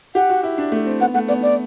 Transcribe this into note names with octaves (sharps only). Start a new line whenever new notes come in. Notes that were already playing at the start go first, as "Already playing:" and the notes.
G4 F#5
F#4
E4
D4
A3
C4
B3 F#5
A3 F#5
B3 D5
D5